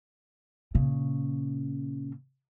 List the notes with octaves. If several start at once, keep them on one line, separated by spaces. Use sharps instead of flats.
A#2 C#3